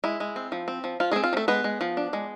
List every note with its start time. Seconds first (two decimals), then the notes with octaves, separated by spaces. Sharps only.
0.04 G#3 E4
0.20 G#3
0.36 C4
0.52 F3
0.68 C4
0.84 F3
1.00 F3 F4
1.11 G#3 C4 G#4
1.24 F4
1.33 F3
1.37 A3 A4
1.48 G#3 B3 B4
1.64 G#3
1.81 F3
1.97 D4
2.13 G#3